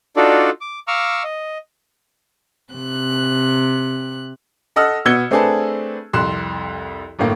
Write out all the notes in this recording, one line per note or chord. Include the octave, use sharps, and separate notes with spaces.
D4 D#4 F4 F#4 A4 D5
D6
F5 A#5 C#6 D6 E6 F6
D#5
C3 F#6
A4 D#5 F#5 E6 F6
B2 B3 E6 G#6 C#7 G7
A3 C4 D4 G#4 B4 A5
C2 F2 C6 F#6 E7
G1 A2 A#3